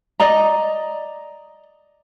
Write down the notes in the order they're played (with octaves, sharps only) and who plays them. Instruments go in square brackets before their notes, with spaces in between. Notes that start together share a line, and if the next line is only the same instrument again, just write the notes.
[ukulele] D5 D#5 A#5